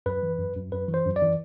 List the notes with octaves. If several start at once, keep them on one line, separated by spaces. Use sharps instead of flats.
F#2 B4
E3
F#2
F#2
F#2 B4
E3
C5
F#2
D5
E3